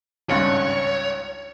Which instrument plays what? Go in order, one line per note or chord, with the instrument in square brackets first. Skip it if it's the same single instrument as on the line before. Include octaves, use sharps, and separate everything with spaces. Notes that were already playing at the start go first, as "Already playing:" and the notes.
[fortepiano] G#1 C#2 G2 [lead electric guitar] C#5